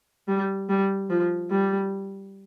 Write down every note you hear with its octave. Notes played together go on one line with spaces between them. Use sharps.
G3
G3
F3
G3